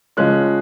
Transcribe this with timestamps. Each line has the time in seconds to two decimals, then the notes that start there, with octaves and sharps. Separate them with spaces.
0.17 C#3 F3 G#3 C#4 F#6